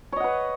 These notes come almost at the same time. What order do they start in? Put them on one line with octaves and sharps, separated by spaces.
C#5 D#5 F#5 B4